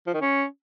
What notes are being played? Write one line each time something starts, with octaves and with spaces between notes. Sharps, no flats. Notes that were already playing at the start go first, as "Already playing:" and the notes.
F3
D#3
C#4